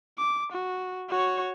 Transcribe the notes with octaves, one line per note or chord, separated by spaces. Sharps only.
D6
F#4
F#4 C#5